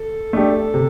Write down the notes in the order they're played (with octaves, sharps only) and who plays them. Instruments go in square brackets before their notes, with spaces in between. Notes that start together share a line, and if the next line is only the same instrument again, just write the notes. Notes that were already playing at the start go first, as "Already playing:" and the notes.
Already playing: [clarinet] A4
[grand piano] A3 D4 G4
C3